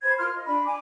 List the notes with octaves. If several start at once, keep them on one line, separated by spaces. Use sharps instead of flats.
B4 C5 B5 G#6
F4 A#4 C6 F6
D#5
D4 B5
G#5 D6